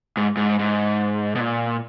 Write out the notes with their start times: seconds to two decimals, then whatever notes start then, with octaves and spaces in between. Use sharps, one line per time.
0.17 G#2
0.37 G#2
0.59 G#2
1.35 B2
1.40 A#2